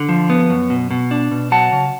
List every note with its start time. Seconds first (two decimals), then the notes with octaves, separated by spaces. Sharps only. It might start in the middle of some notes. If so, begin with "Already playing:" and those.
Already playing: D3
0.09 F3
0.30 B3
0.50 F#2
0.70 B2
0.91 B2
1.11 D4
1.31 B2
1.51 F#3 F#5 A5
1.72 C#3